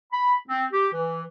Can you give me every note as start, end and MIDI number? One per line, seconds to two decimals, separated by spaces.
0.12 0.34 83
0.48 0.65 60
0.72 0.86 67
0.93 1.23 52